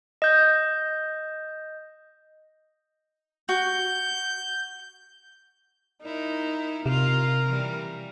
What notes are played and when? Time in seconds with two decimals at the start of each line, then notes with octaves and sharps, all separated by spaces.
0.22 D#5 G6
3.49 F#4 G6
6.03 D#4 E4 A#4
6.86 C3 F4 A#4
7.45 E3 G3